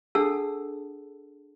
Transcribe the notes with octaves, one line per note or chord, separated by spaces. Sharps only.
D4 G#4 A4 F#5 A5 E6